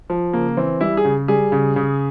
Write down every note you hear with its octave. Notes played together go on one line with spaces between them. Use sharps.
F3
C#3 A#3
E3 C4
G3 E4
G#4
C#3
G3 G#4
C#3
C#3